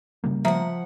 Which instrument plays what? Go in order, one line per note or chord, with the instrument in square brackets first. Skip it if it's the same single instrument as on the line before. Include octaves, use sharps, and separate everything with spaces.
[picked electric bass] C#3 G3 A#3
[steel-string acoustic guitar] F3 F#5 [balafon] E5 A#5